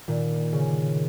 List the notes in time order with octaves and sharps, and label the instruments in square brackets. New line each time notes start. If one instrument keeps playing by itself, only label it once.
[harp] A#2 [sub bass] D#3
[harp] C#3